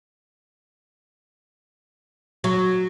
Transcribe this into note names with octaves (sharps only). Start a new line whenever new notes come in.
F#3